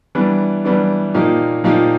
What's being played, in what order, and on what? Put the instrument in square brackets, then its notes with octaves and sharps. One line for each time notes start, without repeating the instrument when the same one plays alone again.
[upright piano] E3 G3 B3 D4
E3 G3 B3 D4
A#2 F3 A#3 D#4 G4
A#2 F3 A#3 D#4 G4